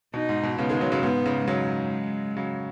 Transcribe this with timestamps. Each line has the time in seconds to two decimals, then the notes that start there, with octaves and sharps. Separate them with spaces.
0.14 B2 D#4
0.29 G#2
0.43 B2
0.58 G#2 C#3 B3
0.69 D#3 G#3
0.81 C#3 F#3
0.92 C#3 F#3
1.03 G#2 B3
1.25 G#2 C#3
1.47 C#3 F#3 G#3
2.37 C#3 F#3